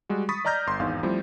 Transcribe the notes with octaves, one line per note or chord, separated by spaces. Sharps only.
G3 G#3 F#4
B5 C#6 D#6 A6 B6
D5 D#5 A#5 F6 G6 A#6
G1 C6
G#1 E2 D#4 F5
F3 G3 A3 C4 E4